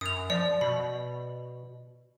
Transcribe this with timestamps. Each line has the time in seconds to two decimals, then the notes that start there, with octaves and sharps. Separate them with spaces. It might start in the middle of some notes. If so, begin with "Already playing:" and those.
0.01 F#2 D#6 F7
0.30 F3 D5
0.61 B2 B5